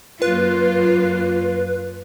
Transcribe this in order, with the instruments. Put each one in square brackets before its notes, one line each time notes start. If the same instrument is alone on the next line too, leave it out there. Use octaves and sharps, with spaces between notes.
[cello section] F#2 A#3 F4 [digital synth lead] B4